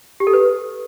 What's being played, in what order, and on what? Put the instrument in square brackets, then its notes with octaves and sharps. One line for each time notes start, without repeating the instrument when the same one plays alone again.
[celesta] G4
A4
B4